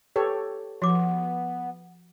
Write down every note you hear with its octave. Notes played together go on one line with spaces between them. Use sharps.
G4 A4 B4 C#5
F3 B3 F#4 D6